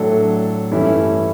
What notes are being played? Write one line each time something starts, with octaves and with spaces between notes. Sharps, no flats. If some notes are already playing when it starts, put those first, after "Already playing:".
Already playing: A2 F#3 A3 D4 A4
G2 E3 A3 C#4 E4